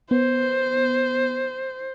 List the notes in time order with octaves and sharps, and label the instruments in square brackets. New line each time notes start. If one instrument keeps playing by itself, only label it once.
[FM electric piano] B3 [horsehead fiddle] C5